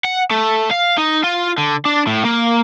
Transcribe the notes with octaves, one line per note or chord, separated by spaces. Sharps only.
F#5
A3
F5
D#4
F4
D3
D4
A2
A#3